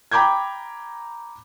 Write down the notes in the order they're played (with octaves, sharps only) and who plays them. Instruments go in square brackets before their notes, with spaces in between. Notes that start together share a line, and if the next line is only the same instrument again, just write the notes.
[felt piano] G5 A#5 B5 D6 G6 G#6